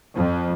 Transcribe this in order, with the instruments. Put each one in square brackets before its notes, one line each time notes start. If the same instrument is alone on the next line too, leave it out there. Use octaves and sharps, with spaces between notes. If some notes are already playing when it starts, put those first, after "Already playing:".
[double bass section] F2